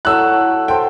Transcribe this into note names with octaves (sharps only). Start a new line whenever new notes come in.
F#3 A3 E4 E6 F#6
A4 C5 F#5 G5